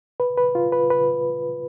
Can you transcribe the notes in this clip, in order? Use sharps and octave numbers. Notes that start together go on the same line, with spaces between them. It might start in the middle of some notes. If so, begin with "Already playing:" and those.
B4
B4
F4
B4
B4